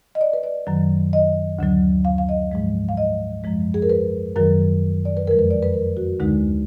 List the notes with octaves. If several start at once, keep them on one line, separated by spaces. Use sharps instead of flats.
D#5
D5
B4
D5
F#2 D#3 F#3
D#5
D2 D3 F#3
F5
F5
D#5
G#2 F3 G#3
F5
D#5
F#2 F3 G#3
G#4
A#4
B4
F#2 D#3 F#3 A#4
D5
B4
F2 D3 F3 G#3 A#4
B4
D5
B4
A#4
F#4
D2 D3 G#3 D#4